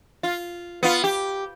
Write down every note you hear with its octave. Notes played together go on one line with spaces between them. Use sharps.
F4
B3 F4
G4